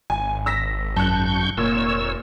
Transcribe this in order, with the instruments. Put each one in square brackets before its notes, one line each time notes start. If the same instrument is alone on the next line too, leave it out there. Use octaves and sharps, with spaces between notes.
[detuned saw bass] G#1 [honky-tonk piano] G#5
[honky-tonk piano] E6 A#6 B6
[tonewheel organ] F#2 C#6 G6 [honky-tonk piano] A5 F#6
[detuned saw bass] F1 [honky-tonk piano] A#2 [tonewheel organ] C#5 E6